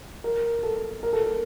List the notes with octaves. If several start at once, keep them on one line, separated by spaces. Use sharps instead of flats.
A#4
A4
A#4
A4
A#4